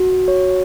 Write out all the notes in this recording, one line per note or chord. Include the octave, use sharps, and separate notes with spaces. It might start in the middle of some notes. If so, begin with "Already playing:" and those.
Already playing: F#4
C#5